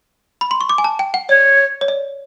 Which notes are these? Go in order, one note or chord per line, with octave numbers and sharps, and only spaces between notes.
B5
C6
C#6
D6
G#5
A5
G5
F#5
C#5 D5
C#5
D5